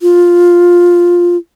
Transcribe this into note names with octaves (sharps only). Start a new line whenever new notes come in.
F4